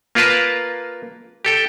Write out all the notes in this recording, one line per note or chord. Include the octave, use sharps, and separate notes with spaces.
A#3 F4 A#4 B4 A5
G4 A4 G5